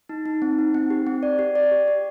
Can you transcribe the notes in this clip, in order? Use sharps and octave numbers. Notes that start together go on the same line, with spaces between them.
D#4
D#4
C4
D#4
C4
G4
C4
D5
G4
D5
G4
G4